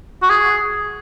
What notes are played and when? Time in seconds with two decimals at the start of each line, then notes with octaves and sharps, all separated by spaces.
0.22 F#4
0.30 G#4